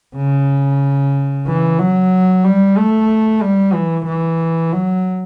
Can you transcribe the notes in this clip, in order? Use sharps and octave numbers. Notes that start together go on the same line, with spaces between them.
C#3
E3
F#3
G3
A3
G3
E3
E3
F#3